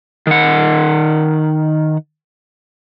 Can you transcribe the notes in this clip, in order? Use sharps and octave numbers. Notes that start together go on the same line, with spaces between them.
D#3 F#5